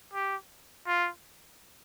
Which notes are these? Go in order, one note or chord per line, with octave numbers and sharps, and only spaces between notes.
G4
F4